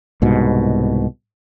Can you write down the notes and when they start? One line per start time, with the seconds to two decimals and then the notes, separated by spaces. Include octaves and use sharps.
0.22 C2 G#2 B2